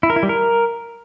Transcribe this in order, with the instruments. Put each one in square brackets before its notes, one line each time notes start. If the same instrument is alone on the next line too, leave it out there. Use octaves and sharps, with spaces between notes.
[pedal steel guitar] E4
A#4
E4
G3
A#4